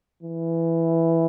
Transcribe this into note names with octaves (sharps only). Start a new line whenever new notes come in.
E3